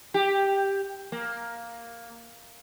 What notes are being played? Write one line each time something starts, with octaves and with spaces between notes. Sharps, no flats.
G4
A#3